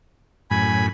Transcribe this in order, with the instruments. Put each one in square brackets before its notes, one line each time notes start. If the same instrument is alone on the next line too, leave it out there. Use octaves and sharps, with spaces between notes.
[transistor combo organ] F#2 A2 [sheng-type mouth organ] G#5 B5